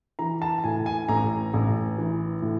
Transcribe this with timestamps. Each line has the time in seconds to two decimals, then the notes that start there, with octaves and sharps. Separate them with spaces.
0.19 E3 A#5
0.42 A5
0.64 A2 G#5
0.86 G#5
1.09 A1 A#5
1.54 A1
1.98 E3
2.42 A2